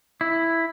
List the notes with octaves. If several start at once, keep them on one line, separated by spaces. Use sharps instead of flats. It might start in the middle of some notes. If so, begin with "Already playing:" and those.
E4